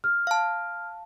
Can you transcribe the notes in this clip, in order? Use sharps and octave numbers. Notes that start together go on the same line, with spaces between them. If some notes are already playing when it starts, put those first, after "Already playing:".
F6
F5 A5